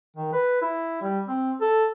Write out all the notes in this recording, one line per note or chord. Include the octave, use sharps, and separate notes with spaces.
D#3
B4
E4
G3
C4
A4